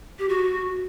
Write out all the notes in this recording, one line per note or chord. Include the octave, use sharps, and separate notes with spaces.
G4
F#4